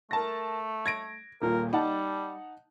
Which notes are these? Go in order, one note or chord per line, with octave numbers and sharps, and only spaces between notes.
A3 A#4 A5 A#6
G#6 A#6 D7
D#1 A#2 A#4
G3 D#4 F#5 A5